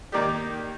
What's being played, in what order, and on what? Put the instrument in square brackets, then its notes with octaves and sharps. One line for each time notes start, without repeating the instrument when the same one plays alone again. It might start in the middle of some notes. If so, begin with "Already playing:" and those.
[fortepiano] D#3 A#3 D#4 G4 [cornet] D5